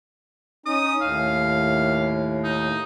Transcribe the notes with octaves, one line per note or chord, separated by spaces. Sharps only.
C#4 D#4 D#6
D#2 A2 F5
D#4